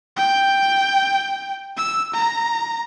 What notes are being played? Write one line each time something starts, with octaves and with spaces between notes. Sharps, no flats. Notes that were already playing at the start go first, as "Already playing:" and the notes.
G5
E6
A#5